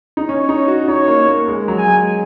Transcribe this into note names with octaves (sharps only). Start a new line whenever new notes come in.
D#4
C#4 C#5
D#4
F#4
D#4 C#5
A#3
A#3
G#3
F#3
G#5
G#3